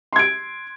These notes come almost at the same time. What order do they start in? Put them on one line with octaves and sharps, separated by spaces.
C6 G#6 D7